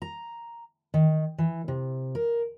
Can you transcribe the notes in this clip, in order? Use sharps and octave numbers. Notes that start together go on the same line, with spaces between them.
A#5
D#3
E3
C3
A#4